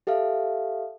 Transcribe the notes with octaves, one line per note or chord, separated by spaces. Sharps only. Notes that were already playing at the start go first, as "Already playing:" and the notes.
G4 A4 E5 F5